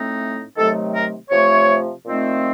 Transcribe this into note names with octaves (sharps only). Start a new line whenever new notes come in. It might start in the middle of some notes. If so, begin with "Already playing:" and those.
Already playing: A2 A3 C4 D#4
C3 D#3 F#3 A3 A4
A#4
C3 F3 A3 C#5
A#2 F3 A3 C4 D#4